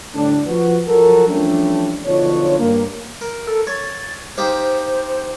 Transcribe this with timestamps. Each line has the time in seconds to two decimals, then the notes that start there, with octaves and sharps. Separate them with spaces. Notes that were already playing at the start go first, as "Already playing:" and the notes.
0.15 A2 D3 G3 D4
0.46 F3 F#4 B4
0.87 F3 F#3 F#4 A4 A#4
1.28 E3 F3 G3 A3 C#4 D4
2.06 B1 D3 F3 D4 F4 C#5
2.59 G2 A#3
3.21 A#4
3.47 A4
3.67 C#5 A6
4.38 D#4 G4 C5 F5